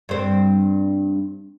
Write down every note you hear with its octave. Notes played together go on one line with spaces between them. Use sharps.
G2 C4